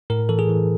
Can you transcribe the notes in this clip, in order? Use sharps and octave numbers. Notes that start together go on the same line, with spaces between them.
A2 A#4
E3 A4
G#4
E3